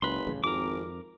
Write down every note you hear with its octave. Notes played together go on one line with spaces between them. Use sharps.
F#1 C#2 B4 C6
D#1 A1 C#3
G#1 F2 A#4 D6